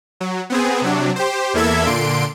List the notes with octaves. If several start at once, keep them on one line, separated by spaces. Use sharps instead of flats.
F#3
B3 C4 G#4
C3 F#3 D4
G4 C5
E2 A#3 E4 A4 E5 G#6
A#2 D3 C6 D7